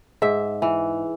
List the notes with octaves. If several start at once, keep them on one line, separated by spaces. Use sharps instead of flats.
G#2 E5
E3